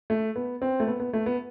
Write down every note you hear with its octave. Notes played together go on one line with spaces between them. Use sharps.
A3
B3
C4
A3
B3
B3
A3
B3